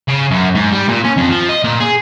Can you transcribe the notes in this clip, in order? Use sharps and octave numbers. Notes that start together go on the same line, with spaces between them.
C#3
F#2
G#2
G3
A#2
C#4
F2
F3
D#5
A#2
G#4